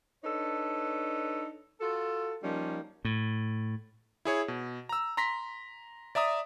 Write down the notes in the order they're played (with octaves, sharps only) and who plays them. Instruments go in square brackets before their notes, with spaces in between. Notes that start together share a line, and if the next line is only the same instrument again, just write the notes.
[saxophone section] D4 D#4 A4 B4 C#5
F4 F#4 A4
F3 G3 A#3 C#4 D#4
[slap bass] A2
[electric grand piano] E4 G#4 C#5
B2
A#5 E6
A#5 C6 A#6 B6
D5 E5 A#5 D#6